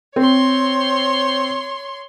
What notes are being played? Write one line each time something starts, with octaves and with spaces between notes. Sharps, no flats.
C4 C#5 C6